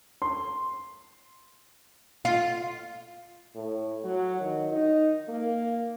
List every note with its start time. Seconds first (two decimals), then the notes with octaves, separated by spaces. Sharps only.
0.22 C6
2.25 F4
3.55 A2
4.04 F#3
4.41 D#3
4.72 D#4
5.28 A#3